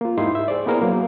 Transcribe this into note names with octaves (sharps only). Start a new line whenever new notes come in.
A#3 F4
G#2 D#4 E4 G4 C6
E5
G#4 C5 D5
A#3 B3 E4 G#4 A#4
F#3 A#3